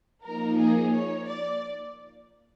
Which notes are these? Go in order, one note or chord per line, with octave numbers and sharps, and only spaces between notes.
F3 A#3 D#4 A#4
G#4
C#5
D5